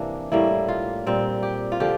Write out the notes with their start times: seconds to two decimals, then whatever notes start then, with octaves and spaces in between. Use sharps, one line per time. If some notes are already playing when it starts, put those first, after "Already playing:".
Already playing: C3 E3 A#3 D4
0.32 A2 G3 A#3 E4
0.69 F4
1.07 A#2 G3 C4
1.43 G4
1.72 F4
1.80 D3 F3 G4